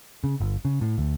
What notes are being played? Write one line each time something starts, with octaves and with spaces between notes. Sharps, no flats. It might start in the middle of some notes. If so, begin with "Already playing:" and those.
C#3
G1
C#3
A2
D2